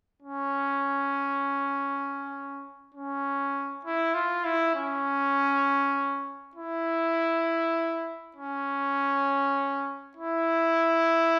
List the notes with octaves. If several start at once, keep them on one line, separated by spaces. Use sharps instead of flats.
C#4
C#4
E4
F4
E4
C#4
E4
C#4
E4